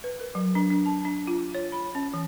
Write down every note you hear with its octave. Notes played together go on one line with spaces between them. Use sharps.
B4
A#4
F#3
D4
D4
A5
D4
F4
C#5
B5
C#4
E3